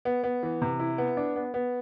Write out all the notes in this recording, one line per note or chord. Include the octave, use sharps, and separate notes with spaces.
B3
B3
E3
C3
E4
B3
D4
B3
B3